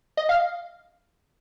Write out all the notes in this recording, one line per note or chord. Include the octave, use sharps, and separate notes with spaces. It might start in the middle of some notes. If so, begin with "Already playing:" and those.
D#5
F5